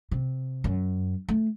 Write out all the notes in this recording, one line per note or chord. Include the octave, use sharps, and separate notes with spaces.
C3
F#2
A3